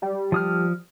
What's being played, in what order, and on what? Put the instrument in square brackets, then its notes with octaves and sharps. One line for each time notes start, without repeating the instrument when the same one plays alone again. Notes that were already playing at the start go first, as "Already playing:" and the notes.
[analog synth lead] G3
[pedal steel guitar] F3 D#6 F6